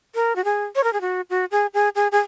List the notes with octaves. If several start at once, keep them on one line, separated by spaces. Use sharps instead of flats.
A#4
F#4
G#4
C#5
A#4
G#4
F#4
F#4
G#4
G#4
G#4
G#4